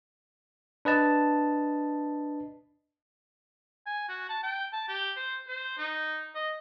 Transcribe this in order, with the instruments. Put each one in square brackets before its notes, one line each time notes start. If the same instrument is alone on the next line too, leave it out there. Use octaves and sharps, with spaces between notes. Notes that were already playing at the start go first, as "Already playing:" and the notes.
[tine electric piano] D4 B4 D#5 A5
[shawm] G#5
F#4
A5
G5
A5
G4
C5
C5
D#4
D#5